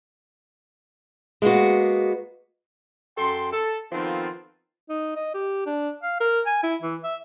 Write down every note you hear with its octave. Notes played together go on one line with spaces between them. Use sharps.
G#3 A#3 B3 F#4
F#2 A4 G5 C6
A4
D#3 F3 B3 C4 F4 A4
D#4
D#5
G4
D4
F5
A#4
G#5
E4
E3
E5